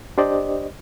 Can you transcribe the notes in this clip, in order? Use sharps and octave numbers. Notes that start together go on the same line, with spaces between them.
D4 G4 C5 D5 D#5